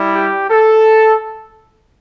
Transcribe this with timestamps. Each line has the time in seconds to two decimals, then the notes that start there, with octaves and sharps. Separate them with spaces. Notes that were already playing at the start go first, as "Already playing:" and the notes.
Already playing: G3 E4
0.15 G4
0.50 A4